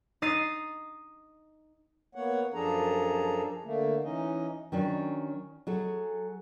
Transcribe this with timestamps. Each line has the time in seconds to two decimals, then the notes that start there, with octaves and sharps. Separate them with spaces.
0.22 D#4 D#6 A6 C7
2.15 A#3 B3 C#5 F#5
2.54 F#2 F3 D4 G#4 A4 A#5
3.64 D3 A3 A#3
4.04 E3 C#4 D#4 D#5
4.72 D#3 F#3 C#4 D4
5.67 F#3 G#4 A4